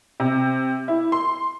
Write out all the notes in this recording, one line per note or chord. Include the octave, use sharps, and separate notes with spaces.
C3
E4
C6